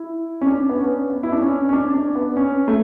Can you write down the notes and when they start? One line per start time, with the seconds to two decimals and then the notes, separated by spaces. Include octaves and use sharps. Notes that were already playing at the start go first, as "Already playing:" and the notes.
Already playing: E4
0.41 C#4
0.47 D4
0.69 B3
0.78 C#4
1.10 B3
1.23 E4
1.32 D4
1.42 C#4
1.69 C#4
1.73 D4
1.94 D4
2.15 B3
2.37 C#4
2.68 A3